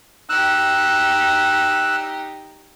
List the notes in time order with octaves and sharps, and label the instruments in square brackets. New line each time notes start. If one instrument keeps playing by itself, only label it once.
[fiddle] D#4 G4 [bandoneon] E6 F#6